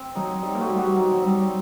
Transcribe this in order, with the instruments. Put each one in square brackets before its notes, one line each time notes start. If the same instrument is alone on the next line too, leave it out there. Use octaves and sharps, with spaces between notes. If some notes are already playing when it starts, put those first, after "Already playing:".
Already playing: [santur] C4
[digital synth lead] F#3 [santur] D#4
[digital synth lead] G3 [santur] D#4
[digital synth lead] A#3
[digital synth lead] A3 [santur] F#4
[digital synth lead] G3
[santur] F#4
[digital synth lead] F#3 [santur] D#4
[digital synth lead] F#3
[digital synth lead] G3 [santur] C4